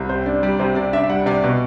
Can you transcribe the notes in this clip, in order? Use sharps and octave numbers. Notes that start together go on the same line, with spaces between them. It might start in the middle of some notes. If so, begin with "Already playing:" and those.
Already playing: C2
C3 C5
D4 D5
G3 D5
C3 C5
C3 D5
D4 E5
E5
G3 F#5
C3 D5
B2